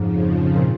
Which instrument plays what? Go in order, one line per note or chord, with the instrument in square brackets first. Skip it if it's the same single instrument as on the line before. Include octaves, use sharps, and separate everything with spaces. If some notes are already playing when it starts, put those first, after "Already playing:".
Already playing: [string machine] F2 C#3 F3 [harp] G#2
[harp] A#2